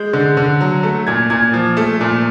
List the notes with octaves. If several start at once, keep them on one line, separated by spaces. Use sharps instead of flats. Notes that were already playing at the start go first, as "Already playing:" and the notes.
Already playing: G#3 G6
D3
D3
F#3
A3
A#2 G#6
A#2 G#6
F3
A3
A#2